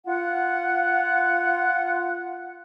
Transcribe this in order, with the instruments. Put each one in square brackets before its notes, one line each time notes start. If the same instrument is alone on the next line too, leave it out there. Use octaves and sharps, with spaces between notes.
[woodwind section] F4 F#5